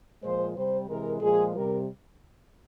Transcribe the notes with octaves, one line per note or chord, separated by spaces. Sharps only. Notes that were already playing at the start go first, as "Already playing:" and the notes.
A#2 F3 G#3 C5
C3 G3 C5
C3 E3 G#3 A#4
A#2 F3 G#3 G#4
C3 G3 A#4